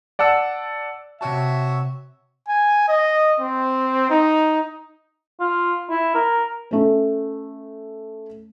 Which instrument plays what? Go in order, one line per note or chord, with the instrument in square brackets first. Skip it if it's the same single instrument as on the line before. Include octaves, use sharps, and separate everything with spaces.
[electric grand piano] D5 F#5 A5 E6
[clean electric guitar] C3 G5 A5 [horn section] F#4 C#5 E5
[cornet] G#5
D#5
C4
D#4
[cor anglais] F4
E4
A#4
[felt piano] A3 C#4